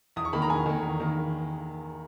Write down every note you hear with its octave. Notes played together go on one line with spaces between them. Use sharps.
E2 D#6
C#6
D#3 A#3 B5
A#5
E2 G#5
D#3 A#3
E2
D#3 A#3